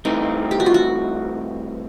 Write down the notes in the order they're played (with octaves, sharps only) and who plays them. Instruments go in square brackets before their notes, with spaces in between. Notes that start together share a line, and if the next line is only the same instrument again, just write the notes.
[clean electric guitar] G2 E3 A3 C4 [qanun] D#4
[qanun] G4
F#4
F4
F#4